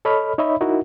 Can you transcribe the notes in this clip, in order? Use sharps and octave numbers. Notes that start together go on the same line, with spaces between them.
A4 C#5 D#5 B5 F6
D#4 C#5 D#5 E5 B5
D#4 E4 F#4 A#4